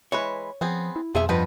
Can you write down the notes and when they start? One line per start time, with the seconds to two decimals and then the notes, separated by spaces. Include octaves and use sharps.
0.12 E3 G#3 B4 C#5
0.61 F3 B3 C4 G#4
0.96 E4
1.15 B1 F2 F3 G#4 E5
1.29 G2 F3 G3 B3 B4 D#5